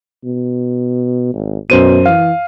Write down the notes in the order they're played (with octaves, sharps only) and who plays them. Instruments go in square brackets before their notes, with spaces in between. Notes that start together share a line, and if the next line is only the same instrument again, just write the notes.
[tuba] B2
G#1
[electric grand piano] F#2 C5 D#7 [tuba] B2
[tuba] E3 [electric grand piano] F5